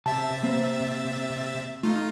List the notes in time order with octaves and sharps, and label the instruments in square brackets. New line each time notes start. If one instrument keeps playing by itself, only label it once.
[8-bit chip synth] C3 E5 A6 [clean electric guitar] A5
[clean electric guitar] A#3 C4 C5
[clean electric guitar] A3 [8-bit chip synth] D#4 F4